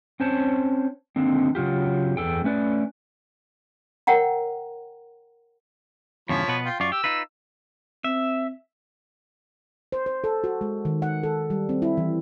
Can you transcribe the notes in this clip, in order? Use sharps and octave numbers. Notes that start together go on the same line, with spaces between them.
C4 C#4 C5 C#5 A5
D3 D#3 A#3 C4
C#3 F#3 F4 G4
E2 A4 G5
A3 C#4 B4 D5
A#4 C#5 F#5 G5 A#5
E2 G2 C#3 F3 C#5 B5
B2 B3 B4
F4 G5
F#2 F4 D5 C#6
G4 E6
D#4 F4 B4
C4 E5
C5
C5
A4
F#4
G#3
D#3
F#5
A4
G3
C4
E4
E3